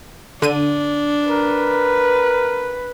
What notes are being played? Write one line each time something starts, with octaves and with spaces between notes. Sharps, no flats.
D3 D4 D#7
A#4 B4